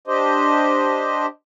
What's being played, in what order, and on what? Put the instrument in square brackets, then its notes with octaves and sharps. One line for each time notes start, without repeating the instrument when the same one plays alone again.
[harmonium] D4 G4 C5 D#5